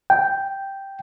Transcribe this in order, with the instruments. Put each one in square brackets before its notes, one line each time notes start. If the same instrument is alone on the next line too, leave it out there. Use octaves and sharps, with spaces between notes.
[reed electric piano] G5